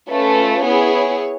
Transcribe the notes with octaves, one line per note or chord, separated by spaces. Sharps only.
A3 C#4 F4 A4 B4
B3 E4 G#4 C#5